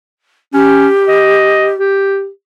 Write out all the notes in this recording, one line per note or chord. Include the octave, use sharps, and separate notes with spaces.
C#4 G4
D#5
G4